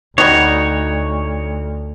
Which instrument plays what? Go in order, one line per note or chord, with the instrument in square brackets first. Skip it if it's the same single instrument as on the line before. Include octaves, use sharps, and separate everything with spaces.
[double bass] D2 [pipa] G3 F#4 [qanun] D#4 [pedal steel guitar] C#5